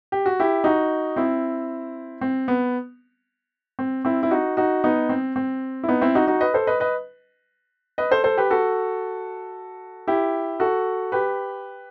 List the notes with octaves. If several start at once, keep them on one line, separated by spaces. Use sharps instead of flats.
G4
F#4
E4 G4
D#4 F#4
C4 E4
C4
B3
C4
C4 E4
E4
D#4 F#4
D#4 F#4
B3 D#4
C4
C4
E4
B3 D#4
C4 E4
D#4 F#4
D#4 F#4
B4 D#5
A4 C5
B4 D#5
B4 D#5
B4 D#5
A4 C5
A4 C5
G4 B4
F#4 A4
E4 G4
F#4 A4
G4 B4